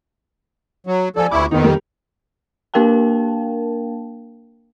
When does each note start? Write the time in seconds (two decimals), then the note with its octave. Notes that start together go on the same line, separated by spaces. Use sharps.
0.87 F#3
1.16 F3 A4 D5 G#5
1.31 D2 E4 C#6 D6
1.51 F2 D#3 B3 D#4
1.64 G3 A#4
2.74 A#3 D4 A#4 F5 G5 A5